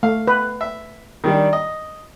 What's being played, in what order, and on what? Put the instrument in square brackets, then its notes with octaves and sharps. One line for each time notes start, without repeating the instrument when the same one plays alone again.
[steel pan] A3 [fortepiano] F5
[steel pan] B4
[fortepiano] E5
D#3 G3 D4
D#5